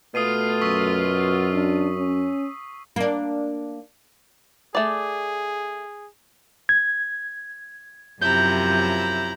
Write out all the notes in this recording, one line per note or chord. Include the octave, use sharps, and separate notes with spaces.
B2 A3 F4 D#6 C7 D#7
F#2 C#6 E6 B6
D4
C#4
A#3 D4
A3 G#4 D5
G#6
F#2 C3 F3 E4 A#5 G6